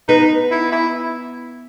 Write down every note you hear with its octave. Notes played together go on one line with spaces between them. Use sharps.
B3 D#4
E4
E4